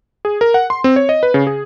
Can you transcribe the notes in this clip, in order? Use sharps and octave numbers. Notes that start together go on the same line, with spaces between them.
G#4
A#4
F#5
C6
C4
C#5
D#5
B4
C#3
G#4